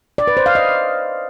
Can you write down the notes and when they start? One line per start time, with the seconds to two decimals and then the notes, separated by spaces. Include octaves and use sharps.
0.18 D5
0.28 B4
0.37 C5
0.46 F5
0.55 D#5